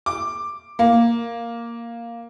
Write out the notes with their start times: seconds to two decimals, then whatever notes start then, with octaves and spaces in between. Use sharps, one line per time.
0.06 D6
0.79 A#3